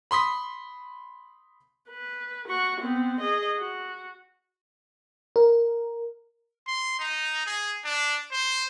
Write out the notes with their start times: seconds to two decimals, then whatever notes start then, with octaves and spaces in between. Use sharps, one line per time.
0.11 B5 C6 D#6 B6
1.89 B4
2.48 F#4 C#6
2.80 B3 C4
3.20 G#4 D#5
3.58 F#4
5.36 A#4
6.67 C6
7.00 D#4
7.46 G#4
7.85 D4
8.32 C5